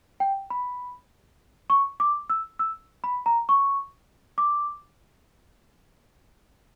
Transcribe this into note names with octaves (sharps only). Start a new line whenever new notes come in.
G5
B5
C#6
D6
E6
E6
B5
A#5
C#6
D6